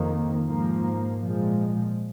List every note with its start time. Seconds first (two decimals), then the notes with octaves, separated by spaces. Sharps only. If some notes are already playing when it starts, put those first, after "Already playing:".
Already playing: F2 D#3 A#3
0.45 G#2 F3 A#3
1.20 A#2 F3 G#3